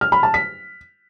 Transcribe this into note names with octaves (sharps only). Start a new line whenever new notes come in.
F6
B5
A5
B6